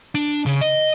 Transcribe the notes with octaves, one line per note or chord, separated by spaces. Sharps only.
D4
C#3
D#5